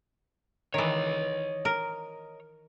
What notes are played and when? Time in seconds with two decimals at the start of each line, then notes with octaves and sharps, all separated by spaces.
0.74 D#3 E3 C#5 D#5
1.65 A#4